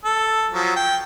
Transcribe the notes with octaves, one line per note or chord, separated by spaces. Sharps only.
A4
F3 F#3
G5